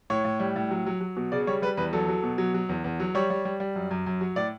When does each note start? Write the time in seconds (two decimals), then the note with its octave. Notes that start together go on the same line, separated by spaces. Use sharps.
0.10 A2 C#5
0.25 A2
0.40 G3
0.56 A2
0.71 F#3
0.86 F#3
1.01 F#3
1.17 B2
1.32 C#3 D5
1.47 G3 C#5
1.62 G3 B4
1.77 E2 B4
1.93 F#3 A4
2.08 F#3
2.23 B2
2.38 F#3
2.54 F#3
2.69 E2
2.84 E2
3.00 F#3
3.15 G3 C#5
3.30 G3
3.45 G3
3.60 G3
3.75 F#2
3.91 F#2
4.06 F#2
4.21 F#3
4.36 A2 D5